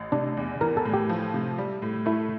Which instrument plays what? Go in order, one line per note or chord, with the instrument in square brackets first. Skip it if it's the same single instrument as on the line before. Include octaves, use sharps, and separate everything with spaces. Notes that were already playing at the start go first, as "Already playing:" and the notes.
Already playing: [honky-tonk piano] A1
[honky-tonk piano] C3 [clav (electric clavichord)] D4
[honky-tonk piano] E2
[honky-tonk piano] E3 [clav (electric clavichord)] A#4
[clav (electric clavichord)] A4
[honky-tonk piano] A2
[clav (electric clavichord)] G4
[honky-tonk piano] F3
C3
G3
A2
[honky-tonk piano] A3 [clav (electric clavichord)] E4